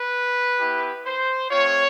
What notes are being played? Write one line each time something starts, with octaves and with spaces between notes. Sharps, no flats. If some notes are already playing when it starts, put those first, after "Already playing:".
Already playing: B4
B3 E4 G4
C5
A3 C4 F4 C#5